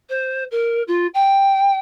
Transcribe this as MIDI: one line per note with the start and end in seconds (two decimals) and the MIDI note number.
0.09 0.43 72
0.51 0.82 70
0.87 1.06 65
1.14 1.79 79